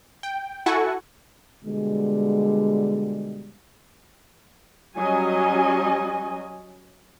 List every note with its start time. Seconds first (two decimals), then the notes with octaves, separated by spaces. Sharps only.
0.23 G5
0.66 E4 F#4 A4 F#5 G#5 C#6
1.65 B2 D3 G3 G#3
4.98 F#3 G3 C#4 D#5 G#5